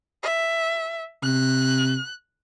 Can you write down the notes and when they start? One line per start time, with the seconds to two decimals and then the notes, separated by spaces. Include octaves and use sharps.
0.23 E5
1.23 C3 F#6